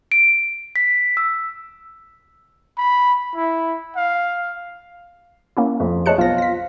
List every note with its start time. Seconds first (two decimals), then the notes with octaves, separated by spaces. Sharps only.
0.12 D7
0.76 B6
1.17 E6
2.77 B5
3.35 E4
3.96 F5
5.57 A#3 C#4 E4
5.80 F2
6.06 G#4 C#5 D#5 A5 F#6 C#7
6.18 B1 B3 F4 C5 A#6
6.38 A#6 B6